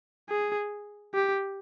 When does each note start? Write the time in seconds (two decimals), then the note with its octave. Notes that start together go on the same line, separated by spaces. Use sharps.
0.29 G#4
1.14 G4